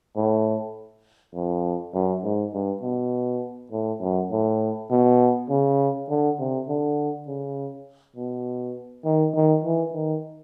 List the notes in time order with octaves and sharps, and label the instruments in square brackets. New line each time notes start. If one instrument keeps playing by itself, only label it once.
[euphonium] A2
F2
F#2
G#2
G2
B2
A2
F#2
A2
B2
C#3
D3
C3
D3
C#3
B2
D#3
D#3
E3
D#3